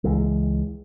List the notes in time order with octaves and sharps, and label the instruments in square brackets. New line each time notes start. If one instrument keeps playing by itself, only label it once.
[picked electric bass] C#2 E3 G#3